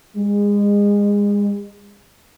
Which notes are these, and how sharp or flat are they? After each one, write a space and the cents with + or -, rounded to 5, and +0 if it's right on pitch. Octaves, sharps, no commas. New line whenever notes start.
G#3 -30